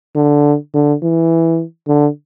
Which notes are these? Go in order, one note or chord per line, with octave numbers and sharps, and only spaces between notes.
D3
D3
E3
D3